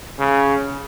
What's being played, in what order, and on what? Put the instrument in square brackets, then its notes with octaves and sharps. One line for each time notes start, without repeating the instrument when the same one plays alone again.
[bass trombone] C#3